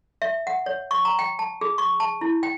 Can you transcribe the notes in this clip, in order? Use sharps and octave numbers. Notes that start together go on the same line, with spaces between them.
E5
F#5
C#5
C#6
A#5
G5
A5
G#4
C#6
A5
E4
G5